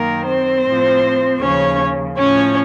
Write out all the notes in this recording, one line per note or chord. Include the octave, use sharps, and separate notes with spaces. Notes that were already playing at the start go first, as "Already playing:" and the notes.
Already playing: F#2 D#3 A#3 A#4
C4 C5
A2 F3
D#2 C#3 F3 C#4 C#5
A2 F3 C#4 C#5